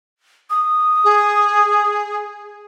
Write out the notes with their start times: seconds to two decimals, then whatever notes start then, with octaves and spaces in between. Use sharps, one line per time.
0.50 D#6
1.04 G#4